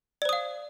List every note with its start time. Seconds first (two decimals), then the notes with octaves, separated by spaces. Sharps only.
0.22 D5
0.25 C5
0.29 D#6
0.33 F5